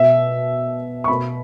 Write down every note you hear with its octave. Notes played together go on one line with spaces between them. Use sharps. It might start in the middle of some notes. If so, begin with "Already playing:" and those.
Already playing: B2 E5
C#6
B2 B5